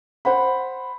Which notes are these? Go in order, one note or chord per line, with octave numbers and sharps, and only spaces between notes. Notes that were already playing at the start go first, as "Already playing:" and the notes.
C5 F#5 B5